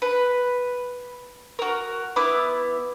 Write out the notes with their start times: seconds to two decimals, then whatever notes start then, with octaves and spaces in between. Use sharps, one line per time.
0.02 B4
1.59 F#4 A#4
2.16 B3 E4 D6 F#6